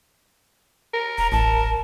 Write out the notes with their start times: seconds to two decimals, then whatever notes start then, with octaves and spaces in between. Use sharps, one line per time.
0.94 A#4
1.18 D#1 A#5
1.32 A1 A5